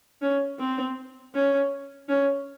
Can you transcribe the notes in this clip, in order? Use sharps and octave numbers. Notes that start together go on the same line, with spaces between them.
C#4
C4
C#4
C#4